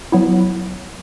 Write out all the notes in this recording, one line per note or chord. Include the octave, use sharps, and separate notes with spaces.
F#3 B3 E4